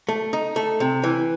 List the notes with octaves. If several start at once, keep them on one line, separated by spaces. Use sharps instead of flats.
A3
D#4
A3
C3
E3